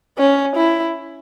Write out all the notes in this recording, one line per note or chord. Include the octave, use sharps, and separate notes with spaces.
C#4
E4